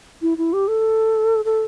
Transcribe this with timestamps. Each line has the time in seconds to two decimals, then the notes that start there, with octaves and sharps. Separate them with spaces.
0.22 E4
0.38 E4
0.53 G4
0.68 A4
1.45 A4